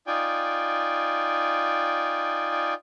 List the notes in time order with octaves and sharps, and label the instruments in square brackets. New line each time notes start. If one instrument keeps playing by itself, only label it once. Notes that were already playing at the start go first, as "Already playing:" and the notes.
[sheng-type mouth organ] D#4 F4 D5 G5 G#5